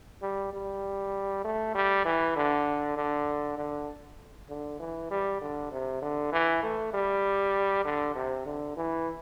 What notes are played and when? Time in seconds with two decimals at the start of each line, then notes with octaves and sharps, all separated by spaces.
0.22 G3
0.53 G3
1.45 A3
1.75 G3
2.05 E3
2.36 D3
2.97 D3
3.58 D3
4.49 D3
4.80 E3
5.11 G3
5.42 D3
5.72 C3
6.02 D3
6.33 E3
6.63 A3
6.94 G3
7.85 D3
8.15 C3
8.46 D3
8.77 E3